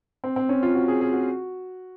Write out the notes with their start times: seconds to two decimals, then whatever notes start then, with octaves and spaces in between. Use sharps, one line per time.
0.24 C4
0.36 C4
0.49 C#4
0.63 F4
0.75 F#4
0.88 G#4
1.01 G#4
1.13 F#4